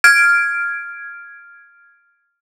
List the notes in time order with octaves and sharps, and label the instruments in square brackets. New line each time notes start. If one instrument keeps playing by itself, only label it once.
[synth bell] F6 G#6 D7